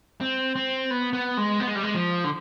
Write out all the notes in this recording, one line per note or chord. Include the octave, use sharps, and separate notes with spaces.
C4
C4
B3
B3
G#3
B3
G#3
G3
G#3
F3
D3